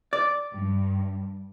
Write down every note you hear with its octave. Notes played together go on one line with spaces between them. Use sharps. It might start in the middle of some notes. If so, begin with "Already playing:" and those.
D5
G2